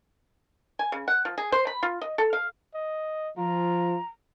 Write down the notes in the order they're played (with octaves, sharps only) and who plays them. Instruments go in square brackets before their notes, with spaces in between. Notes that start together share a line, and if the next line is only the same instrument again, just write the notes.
[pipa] G#5
C#3
F#5
F3
G#4
C5
B5
F4
D#5
A4
F5
[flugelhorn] D#5
[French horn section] F3 [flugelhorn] F4 [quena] A#5